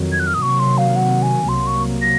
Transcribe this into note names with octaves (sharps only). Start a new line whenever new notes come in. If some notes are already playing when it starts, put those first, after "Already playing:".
Already playing: F2 D#3 F#3
G#6
F#6
F6
D#6
C3 D#3 F#3 A#3 C#6
C6
F5
F#5
G#5
C2 C3 F#3 A#3 C6
C#6
A#6